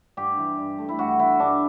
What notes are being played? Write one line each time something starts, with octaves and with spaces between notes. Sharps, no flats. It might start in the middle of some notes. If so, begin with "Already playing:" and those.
G2 G4
E3
G2
A3
E4
G2 F#4
E3 E4
G2 D4